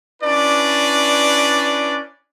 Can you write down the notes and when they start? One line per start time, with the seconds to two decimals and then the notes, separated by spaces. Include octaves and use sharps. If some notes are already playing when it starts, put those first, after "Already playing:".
0.22 C#4 D4 E4 B4 D5